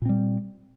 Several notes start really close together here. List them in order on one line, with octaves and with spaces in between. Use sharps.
A#2 C4 G3